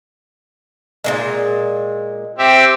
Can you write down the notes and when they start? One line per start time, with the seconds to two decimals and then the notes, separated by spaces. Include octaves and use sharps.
1.04 A#2 D3 G#3
2.38 C4 G4 E5